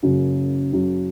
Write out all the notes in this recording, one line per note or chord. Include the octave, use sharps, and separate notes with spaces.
F#1 F#2 C#3 F#3
F#1 F#2 C#3 F#3